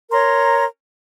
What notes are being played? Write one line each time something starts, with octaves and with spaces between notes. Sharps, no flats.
A#4 C#5 A#5 C6